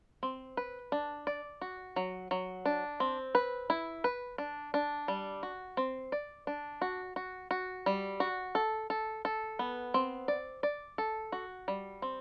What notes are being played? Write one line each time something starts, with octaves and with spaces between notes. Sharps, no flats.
C4
B4
D4
D5
F#4
F#3
F#3
D4
C4
B4
E4
B4
D4
D4
G3
F#4
C4
D5
D4
F#4
F#4
F#4
G3
F#4
A4
A4
A4
B3
C4
D5
D5
A4
F#4
G3
C4